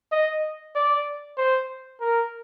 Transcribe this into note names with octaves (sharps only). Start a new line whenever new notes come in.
D#5
D5
C5
A#4